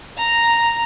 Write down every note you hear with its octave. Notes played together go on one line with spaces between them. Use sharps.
A#5